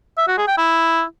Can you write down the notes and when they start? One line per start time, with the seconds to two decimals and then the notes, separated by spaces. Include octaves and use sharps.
0.18 E5
0.28 F#4
0.37 G#4
0.47 G5
0.57 E4